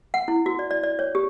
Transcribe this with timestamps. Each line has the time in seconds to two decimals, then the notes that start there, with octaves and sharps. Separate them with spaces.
0.14 F#5
0.28 E4
0.46 F#4
0.59 D5
0.71 D5
0.83 D5
0.99 C#5
1.15 G4